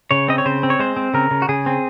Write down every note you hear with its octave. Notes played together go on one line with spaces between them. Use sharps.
C#3 C#5
C4 D#5
C#5
C#3 C5
C4
C#5
G#3 C5
C4
C#3 A#4
C#3
F#4
C#3 G#4
C4